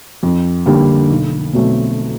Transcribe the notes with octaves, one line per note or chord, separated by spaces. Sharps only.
F2
D3 G3 A#3
B1
B2 F#3 A3 C4